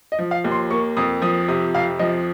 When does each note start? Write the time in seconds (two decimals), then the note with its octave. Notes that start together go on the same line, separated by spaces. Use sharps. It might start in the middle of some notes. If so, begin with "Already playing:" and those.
0.12 D#5
0.19 F3
0.31 F5
0.44 D#2
0.52 C6
0.71 A#3 C#6
0.97 F2 D#6
1.22 F3 D#6
1.48 C3 D#6
1.74 F2 F5
1.99 F3 D#5